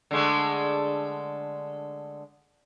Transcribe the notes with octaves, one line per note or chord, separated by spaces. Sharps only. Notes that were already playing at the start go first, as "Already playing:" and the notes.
D3 G#3 A3